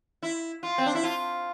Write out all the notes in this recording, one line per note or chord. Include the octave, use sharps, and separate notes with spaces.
E4
F4
C4
D4
E4
F4